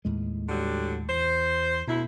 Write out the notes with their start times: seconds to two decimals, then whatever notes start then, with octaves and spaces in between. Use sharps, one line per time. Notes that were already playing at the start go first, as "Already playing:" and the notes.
0.05 D#2 A2 G#3
0.49 D3 F#3 G3
1.09 E2 C5
1.87 D2 B2 E4